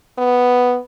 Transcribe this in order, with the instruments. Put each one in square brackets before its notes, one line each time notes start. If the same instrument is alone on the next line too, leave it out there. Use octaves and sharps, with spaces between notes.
[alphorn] B3